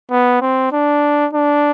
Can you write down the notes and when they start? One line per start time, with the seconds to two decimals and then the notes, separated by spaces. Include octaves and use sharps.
0.11 B3
0.41 C4
0.72 D4
1.33 D4